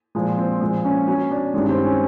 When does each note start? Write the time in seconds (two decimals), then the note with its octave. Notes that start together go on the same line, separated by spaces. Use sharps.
0.15 A#2 F3 G#3
0.38 C4
0.61 A#2 F3 G#3
0.85 C#4
1.07 B2 F#3 C#4
1.31 D4
1.54 G2 D#3 G#3 C#4
1.69 C4
1.85 C#4